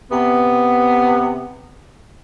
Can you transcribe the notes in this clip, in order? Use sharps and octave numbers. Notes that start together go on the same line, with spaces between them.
C3 B3